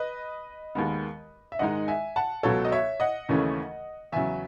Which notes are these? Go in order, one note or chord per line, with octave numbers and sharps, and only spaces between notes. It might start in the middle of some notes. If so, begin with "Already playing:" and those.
Already playing: B4 D#5
D#2 D#3 G#3 B3
E5
G#2 D#3 G#3 D#4 D#5 F#5
E5 G#5
F#5 A5
C#2 B2 F#3 A4 C#5
D#5
C#5 E5
D#5 F#5
D#2 C#3 E3 A3 C#4
E2 C#3 F#3 E5 G#5